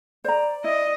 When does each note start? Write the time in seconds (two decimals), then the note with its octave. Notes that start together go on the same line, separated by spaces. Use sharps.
0.24 C5 D5 A#5
0.64 E4 D#5